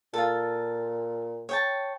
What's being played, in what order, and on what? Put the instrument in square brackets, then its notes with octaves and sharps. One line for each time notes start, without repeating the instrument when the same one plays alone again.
[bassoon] A#2 [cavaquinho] F4 A4
[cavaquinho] C#5 G5 A5